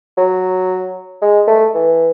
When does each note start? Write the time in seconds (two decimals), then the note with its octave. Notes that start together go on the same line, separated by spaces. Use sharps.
0.17 F#3
1.22 G#3
1.47 A3
1.75 E3